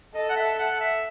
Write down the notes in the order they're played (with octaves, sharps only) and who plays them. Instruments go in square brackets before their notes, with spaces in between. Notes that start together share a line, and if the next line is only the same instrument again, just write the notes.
[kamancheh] A4 [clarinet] D#5
[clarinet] F#5
E5
F#5
E5